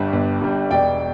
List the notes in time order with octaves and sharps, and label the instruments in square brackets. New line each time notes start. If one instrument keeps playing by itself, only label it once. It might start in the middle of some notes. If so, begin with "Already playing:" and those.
Already playing: [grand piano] G1 G2 G3
G1
G2 G3
E1 D5 G5